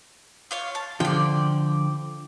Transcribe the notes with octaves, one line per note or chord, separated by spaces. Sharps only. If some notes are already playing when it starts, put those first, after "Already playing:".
F4 C#5 F5
A5
D3 F3 D5 G5